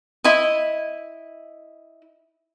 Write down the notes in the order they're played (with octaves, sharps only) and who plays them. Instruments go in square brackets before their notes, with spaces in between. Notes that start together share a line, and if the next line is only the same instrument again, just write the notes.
[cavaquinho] E4 D#5